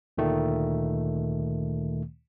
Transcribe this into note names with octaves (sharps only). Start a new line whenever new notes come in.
D2 A#2 D#3 A3